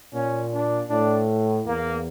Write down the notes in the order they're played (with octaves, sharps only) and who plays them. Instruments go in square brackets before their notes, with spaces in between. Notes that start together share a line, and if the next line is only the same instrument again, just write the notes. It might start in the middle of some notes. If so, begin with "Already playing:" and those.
[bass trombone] A#2 [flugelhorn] C#4
[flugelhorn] D4
[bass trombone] A2 [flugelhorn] D4
[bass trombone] E2 [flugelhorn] A#3